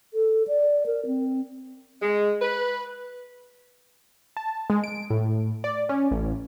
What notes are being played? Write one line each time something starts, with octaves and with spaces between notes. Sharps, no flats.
A4
D5
A#4
C4
G#3
B4
A5
G#3
D7
A2
D5
C#4
A1